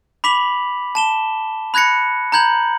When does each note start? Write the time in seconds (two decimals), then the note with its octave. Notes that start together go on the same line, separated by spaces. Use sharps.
0.24 B5 D6 B6 F7 F#7
0.95 A5 E7 G7
1.74 B5 F#6 G#6 A#6 C#7
2.32 A#5 B5 G6 G#6 F#7